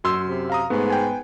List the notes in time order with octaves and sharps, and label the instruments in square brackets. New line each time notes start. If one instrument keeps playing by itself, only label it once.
[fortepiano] F#2 C6 E6
[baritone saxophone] C3
[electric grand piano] F5 A#5 D#6
[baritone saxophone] G#2 [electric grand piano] A3 [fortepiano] B3
[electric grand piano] G5 G#5